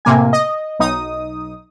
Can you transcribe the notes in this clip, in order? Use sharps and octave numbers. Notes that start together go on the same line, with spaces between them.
A2 C3 A#3 G#5
D#5
B1 D#4 D#6